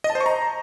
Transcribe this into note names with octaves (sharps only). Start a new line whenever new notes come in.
D#5
A5
C5
C#6
A#5